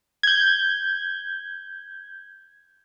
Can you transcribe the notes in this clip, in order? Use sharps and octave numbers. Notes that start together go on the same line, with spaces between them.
G6 G#6